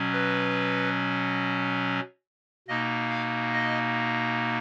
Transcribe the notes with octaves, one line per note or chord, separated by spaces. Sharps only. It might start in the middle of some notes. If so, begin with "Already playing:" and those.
Already playing: B2 F#3 C#4
B4
B2 A#3 D#4 D#5
F5
D#5